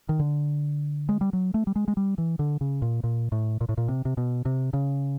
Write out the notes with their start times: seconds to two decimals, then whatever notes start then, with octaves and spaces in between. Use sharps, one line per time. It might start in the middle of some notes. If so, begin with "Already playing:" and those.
0.09 D#3
0.19 D3
1.09 G#3
1.21 G3
1.33 F#3
1.54 A3
1.67 G3
1.76 G#3
1.88 G#3
1.97 G3
2.18 E3
2.39 D3
2.61 C#3
2.82 A#2
3.04 A#2
3.32 A2
3.61 A#2
3.69 A2
3.78 A#2
3.88 C3
4.05 C3
4.17 B2
4.45 C3
4.73 C#3